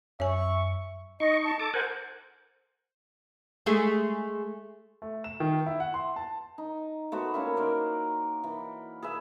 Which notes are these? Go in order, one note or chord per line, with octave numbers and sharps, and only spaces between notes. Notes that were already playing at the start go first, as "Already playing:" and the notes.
F#2 C#5 E5 G#5 C#6
D#4 D#5 C#6
A5
A4 A5 D6
A#4 C5 F#5 G#5
G#3 A3 G#4
A3
E7
D#3
E4
F#5
C6
A5
D#4
A3 B3 F#4 C5
A#3 C#4 E4
D#4 A#4 C5 D5
E3
G#4 B4 E5